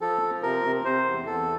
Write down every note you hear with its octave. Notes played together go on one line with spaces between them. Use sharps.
F3 A4
F3
C3 A#4
C3
C3 C5
E2
E2 A4